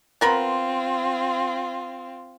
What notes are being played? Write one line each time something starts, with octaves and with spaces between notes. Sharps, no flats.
B3 C4 F4 A#4 B5